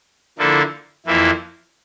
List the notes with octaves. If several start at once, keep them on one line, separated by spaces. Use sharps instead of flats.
D3 F3 A#3 E4 A4
F2 E3 A#3 E4